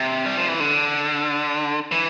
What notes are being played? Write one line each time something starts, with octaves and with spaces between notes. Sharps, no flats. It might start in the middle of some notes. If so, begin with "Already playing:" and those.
Already playing: C3
G3
F3
E3
D3
E3